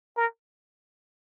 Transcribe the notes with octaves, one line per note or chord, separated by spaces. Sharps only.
A#4